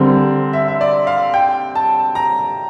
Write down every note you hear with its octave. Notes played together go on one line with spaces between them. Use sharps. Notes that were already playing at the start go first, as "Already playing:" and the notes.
Already playing: D3 G3 C4 A#4
E5
E5
D5
F5
G5
A5
A#5